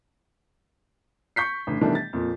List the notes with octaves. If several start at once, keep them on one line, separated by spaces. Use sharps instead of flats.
C#6 G6 B6 C7
A1 D3
B2 D#3 E3 G3 A3 D4
A6
F2 A#2